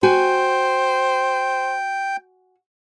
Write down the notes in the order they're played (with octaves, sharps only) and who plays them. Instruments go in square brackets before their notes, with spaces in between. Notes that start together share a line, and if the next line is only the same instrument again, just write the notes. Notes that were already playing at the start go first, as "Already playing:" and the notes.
[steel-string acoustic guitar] F#4 G#5 [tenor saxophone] C5 [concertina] G5